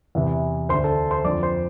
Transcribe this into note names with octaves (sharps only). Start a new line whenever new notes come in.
E2 C3 E3
D2 D3 C5 C6
A4 A5
C5 C6
F2 D3 D5 D6
C5 C6